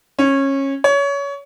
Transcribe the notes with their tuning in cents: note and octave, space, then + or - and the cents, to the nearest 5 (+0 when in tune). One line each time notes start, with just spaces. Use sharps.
C#4 -20
C#5 +25